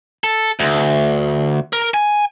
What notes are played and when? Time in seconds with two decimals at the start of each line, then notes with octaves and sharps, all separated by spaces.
0.24 A4
0.59 D2
1.73 A#4
1.94 G#5